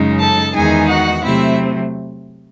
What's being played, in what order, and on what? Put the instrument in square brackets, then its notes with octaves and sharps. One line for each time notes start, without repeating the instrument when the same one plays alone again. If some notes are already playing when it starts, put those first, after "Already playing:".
Already playing: [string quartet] F#2 C#3 G#3 D#4
A4 A5
E2 D#3 G#3 D#4 G#4 G#5
F#4 F#5
C3 F#3 A3 C4 E4 E5